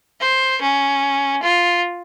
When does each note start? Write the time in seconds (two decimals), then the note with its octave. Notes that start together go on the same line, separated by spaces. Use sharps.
0.20 C5
0.62 C#4
1.43 F4